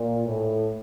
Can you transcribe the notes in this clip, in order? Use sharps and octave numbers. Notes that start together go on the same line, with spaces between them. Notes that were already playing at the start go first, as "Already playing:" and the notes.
Already playing: A#2
A2